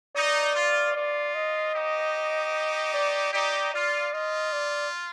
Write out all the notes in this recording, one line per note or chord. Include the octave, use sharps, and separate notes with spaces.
D#4 D5
F4
F4 D5
D#5
D#4 G4
D5
D#4 G4 D5
F4 D5
F4 D#5
D5